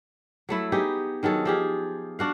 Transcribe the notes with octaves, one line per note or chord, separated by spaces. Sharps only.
F#3 A3 E4
B3 D#4 G4 G#4
D#3 F#3 G#4 A4
F3 G4 G#4
D4 F#4 F5